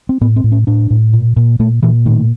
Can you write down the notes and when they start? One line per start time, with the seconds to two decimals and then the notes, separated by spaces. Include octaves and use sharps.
0.09 C4
0.21 A2 B3
0.36 C4
0.44 A2
0.52 C#4
0.67 A2 D4
0.90 A2
1.13 A#2
1.36 A#2
1.59 A#2 A3
1.83 A#2 E3
2.06 A2 D#3